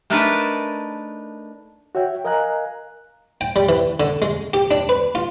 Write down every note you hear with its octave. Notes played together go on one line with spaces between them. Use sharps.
A3 D4 D#4 A#4 B4 A5
F#4 C#5 E5 G5
A#4 D#5 F5 G#5 A#5 F#6
G5
G3
E3
D3
G#3
G4
D4
B4
F4